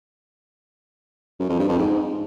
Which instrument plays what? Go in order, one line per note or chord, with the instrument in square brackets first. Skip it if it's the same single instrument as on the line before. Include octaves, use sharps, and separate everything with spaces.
[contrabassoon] F#2
F2
G2
F2
G#2